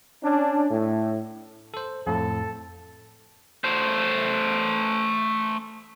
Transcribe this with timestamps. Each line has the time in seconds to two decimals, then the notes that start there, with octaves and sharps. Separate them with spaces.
0.24 C#4 D4
0.71 A2
1.74 A4 C5
2.07 F2 A2 A4
3.64 A3 C5